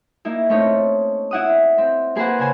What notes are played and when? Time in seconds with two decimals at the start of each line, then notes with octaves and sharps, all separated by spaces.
0.25 A#3 D#4 E4
0.49 A3 C4 C#4 D#4 C#5
1.31 E4 F#5 D#6
1.78 C4
2.15 A#3 G#4 B4 C5 F#5
2.39 C#3 C5 G#5